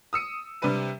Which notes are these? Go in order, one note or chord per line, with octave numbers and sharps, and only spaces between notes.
D#6 E6 C#7 D#7
C3 G3 D4 B4 D#7